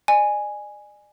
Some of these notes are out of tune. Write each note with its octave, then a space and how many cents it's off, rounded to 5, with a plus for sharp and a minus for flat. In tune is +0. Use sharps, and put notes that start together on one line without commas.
D5 +40 G#5 +0